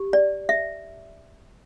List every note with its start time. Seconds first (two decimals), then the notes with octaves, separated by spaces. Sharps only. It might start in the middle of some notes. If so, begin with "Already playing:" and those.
Already playing: G4
0.13 D5
0.49 E5